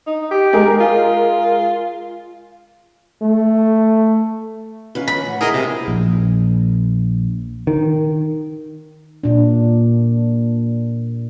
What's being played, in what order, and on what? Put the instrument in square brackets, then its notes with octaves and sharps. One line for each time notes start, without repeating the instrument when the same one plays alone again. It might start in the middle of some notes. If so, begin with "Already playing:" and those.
[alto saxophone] D#4
G4
[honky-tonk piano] G#3 G#4 A#4
[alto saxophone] F4
[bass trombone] A3
[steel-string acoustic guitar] D#3 C#4 F4 [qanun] B4
[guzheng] B5
[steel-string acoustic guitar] A2 F#5
[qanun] G#3 E4 [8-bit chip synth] G#4 A#4 D#5
[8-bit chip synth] C3 [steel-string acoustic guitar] F4
[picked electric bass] A#1
D#3
[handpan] A#2 D4